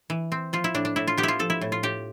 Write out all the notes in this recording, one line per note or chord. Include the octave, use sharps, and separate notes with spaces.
E3
C4
F3 F4
E4
A2 D4
D4
A2 E4
F4
B3 G4
E4 F4
F3 A4
E4
A2
F4
A2 G4